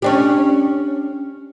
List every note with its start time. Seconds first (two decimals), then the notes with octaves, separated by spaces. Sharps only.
0.02 C#4 D4 G4